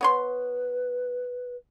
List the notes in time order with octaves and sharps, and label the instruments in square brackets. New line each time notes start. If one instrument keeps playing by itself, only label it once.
[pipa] B3 C#5 C6 [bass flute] B4